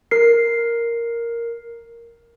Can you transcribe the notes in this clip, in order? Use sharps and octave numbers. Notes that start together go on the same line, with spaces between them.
A#4 C7